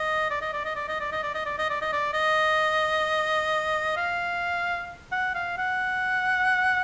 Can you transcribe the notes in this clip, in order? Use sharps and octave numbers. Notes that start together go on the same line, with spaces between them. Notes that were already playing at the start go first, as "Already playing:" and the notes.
Already playing: D#5
D5
D#5
D5
D#5
D5
D#5
D5
D#5
D5
D#5
D5
D#5
D5
D#5
D5
D#5
F5
F#5
F5
F#5